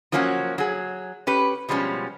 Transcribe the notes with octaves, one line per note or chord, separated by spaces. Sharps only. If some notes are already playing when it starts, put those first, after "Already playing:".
F3 F#3 A#3 C#4 F4 F#4
F#3 G#4
C#4 G4 B4
B2 F3 G3 G#3 C#4